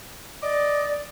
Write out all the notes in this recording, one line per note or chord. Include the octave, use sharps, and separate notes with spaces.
D5 D#5 D6